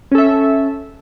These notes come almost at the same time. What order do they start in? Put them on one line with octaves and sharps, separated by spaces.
C#4 A4 E5